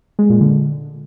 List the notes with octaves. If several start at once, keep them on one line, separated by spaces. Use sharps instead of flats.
G#3
A#2
D3